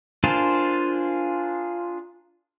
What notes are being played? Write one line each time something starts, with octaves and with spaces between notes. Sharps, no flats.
D4 F4 G#4 A#4 C5